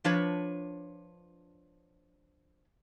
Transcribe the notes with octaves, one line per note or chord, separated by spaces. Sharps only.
F3 D4 B4 C#5